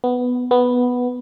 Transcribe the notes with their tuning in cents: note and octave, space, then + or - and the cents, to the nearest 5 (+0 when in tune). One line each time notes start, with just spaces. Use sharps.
B3 +5
B3 +0